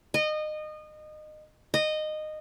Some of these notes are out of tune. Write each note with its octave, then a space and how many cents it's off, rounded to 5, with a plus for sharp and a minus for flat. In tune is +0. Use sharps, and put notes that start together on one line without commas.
D#5 -25
D#5 -15